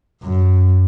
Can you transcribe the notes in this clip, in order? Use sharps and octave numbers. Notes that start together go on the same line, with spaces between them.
F#2